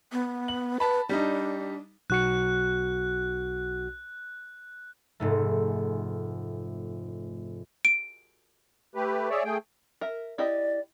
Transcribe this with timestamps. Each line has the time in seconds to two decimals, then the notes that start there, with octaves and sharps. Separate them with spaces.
0.12 B3
0.48 F#7
0.80 B4 A5 B5
1.09 G3 D4 D#4
2.10 B1 F#4 F#6 C#7
5.20 F1 G#2 A3
7.85 D7
8.95 A3 G4 B4
9.30 G#4 C#5 D5 E5
9.44 A3 G#4 G5
10.01 A#4 E5
10.38 E4 G4 D5 D#5